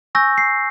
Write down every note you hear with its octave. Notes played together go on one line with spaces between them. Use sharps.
G#5 C#6 E6 G6 A#6
C7